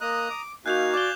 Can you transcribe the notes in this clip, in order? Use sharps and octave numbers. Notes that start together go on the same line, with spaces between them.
A#3 D#5 A#5 D#6 F#6
D6
A#3 D#4 F#4 F5 G#5 F#6 G6 F7
D5 D6 G7